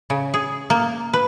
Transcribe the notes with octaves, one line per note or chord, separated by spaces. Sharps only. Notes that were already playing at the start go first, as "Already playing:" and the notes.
C#3
G#4
A#3
B4